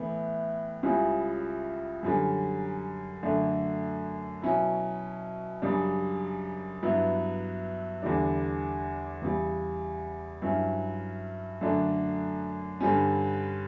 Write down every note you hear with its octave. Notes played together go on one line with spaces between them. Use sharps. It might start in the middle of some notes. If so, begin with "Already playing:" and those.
Already playing: A2 E3 B3 E4
C#2 C#3 G3 C#4 E4
F#2 D3 G3 C#4
F#2 D3 A3 D4
B2 F#3 C#4 E4
F#2 C#3 G3 D4
G2 F#3 B3 E4
E2 D3 G3 D4
E2 C#3 G3
G2 F#3 C#4 E4
F#2 D3 A3 D4
G2 D3 G3 C#4